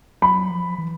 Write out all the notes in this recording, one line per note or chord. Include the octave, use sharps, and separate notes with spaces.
F#3 B5
F3
E3